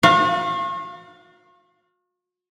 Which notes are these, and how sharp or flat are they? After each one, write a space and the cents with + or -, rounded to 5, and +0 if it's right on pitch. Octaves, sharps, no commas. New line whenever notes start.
F#4 -40 F5 +0